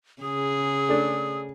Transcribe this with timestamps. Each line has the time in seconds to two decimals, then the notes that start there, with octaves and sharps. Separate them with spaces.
0.22 C#3 G#4 D#6
0.89 A3 D4